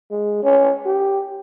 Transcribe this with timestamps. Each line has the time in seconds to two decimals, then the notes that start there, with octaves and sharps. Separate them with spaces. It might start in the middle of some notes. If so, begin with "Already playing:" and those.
0.11 G#3
0.43 C#4
0.86 G4